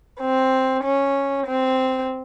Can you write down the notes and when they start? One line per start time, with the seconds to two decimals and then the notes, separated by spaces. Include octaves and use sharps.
0.20 C4
0.83 C#4
1.46 C4